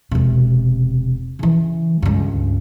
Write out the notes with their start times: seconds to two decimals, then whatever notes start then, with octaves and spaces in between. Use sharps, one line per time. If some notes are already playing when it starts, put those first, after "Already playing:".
0.11 E1 C3
1.39 C#3 E3
2.02 C#2 G2